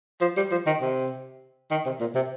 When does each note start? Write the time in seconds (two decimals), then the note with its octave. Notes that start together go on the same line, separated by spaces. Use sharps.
0.21 F3
0.37 G3
0.51 F3
0.66 D#3
0.81 C3
1.71 D#3
1.85 C3
2.00 A#2
2.15 C3